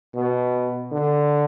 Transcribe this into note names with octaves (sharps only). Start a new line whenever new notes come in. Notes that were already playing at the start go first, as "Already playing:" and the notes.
B2
D3